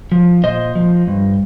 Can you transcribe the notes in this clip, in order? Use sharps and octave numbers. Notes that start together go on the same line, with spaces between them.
F3
A#2 C5 D#5
F3
G2